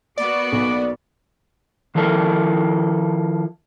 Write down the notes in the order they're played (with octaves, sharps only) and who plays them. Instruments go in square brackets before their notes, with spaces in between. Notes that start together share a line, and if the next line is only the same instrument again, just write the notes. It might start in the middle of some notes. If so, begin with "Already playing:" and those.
[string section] A#3 B3 F#4 [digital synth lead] D5 [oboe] D6
[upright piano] B1
[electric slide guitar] D#3 F3 E4 A4 A#4